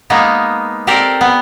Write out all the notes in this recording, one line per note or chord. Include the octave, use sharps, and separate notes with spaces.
G#3 A#3 B3 D#4
C4 G4 A4 A#4 D5
B3